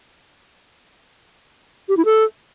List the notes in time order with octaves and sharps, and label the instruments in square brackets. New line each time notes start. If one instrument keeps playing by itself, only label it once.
[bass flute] G4
E4
A4